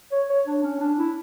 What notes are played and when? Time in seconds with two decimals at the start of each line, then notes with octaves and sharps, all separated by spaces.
0.12 C#5
0.30 C#5
0.47 D4
0.64 C#4
0.80 D4
0.99 E4